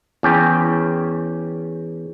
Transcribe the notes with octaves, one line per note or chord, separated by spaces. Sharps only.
E2 C#4 G5